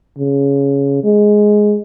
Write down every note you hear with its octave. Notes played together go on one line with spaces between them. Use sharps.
C#3
G#3